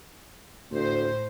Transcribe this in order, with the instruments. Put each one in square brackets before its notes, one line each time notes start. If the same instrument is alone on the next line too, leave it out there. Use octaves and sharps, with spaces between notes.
[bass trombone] D2 [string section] A2 C5